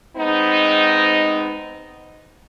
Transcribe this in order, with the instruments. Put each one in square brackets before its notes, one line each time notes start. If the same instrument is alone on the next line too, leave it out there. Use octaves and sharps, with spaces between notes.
[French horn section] G#3 B3 C4 D#4